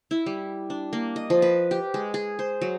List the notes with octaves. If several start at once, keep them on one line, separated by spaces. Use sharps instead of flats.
E4
G3
D4
A#3
D#5
F3
B4
G4
G#3
G#4
C5
F#3